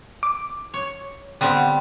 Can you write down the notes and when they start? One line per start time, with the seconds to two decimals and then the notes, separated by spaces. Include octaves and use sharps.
0.23 D6
0.74 C#5
1.41 D3 G3 B3 C4